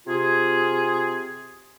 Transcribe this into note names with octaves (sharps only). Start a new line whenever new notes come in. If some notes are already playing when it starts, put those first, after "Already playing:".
C3 F4 G#4